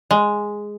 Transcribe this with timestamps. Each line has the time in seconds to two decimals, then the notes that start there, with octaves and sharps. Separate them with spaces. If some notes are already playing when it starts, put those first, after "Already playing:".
0.11 G#3